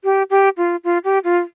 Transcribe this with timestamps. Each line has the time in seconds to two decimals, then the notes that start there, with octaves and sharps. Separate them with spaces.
0.04 G4
0.30 G4
0.57 F4
0.84 F4
1.04 G4
1.24 F4